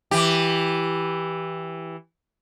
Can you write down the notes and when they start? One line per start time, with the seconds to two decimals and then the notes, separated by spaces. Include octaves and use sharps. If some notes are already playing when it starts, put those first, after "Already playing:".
0.11 E3 G4